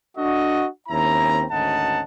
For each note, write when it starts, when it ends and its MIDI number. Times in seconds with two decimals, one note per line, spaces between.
0.18 0.66 62
0.18 0.66 66
0.18 0.66 69
0.18 0.66 75
0.88 1.45 39
0.88 1.45 60
0.88 1.45 61
0.88 1.45 64
0.88 1.45 82
1.51 2.02 32
1.51 2.02 38
1.51 2.02 61
1.51 2.02 63
1.51 2.02 78
1.51 2.02 81